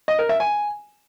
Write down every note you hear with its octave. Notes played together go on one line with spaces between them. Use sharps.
D#5
A#4
E5
G#5